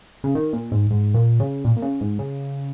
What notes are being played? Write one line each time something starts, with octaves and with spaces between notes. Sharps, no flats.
C#3
D#3
A#2
G#2
G#2
A#2
C#3
A#2
A#2
C#3
G#2
C#3